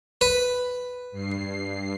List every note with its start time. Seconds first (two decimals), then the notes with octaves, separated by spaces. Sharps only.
0.21 B4
1.12 G2 C7